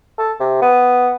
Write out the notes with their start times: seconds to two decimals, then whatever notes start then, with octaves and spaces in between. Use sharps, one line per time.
0.19 A4
0.40 C3
0.62 B3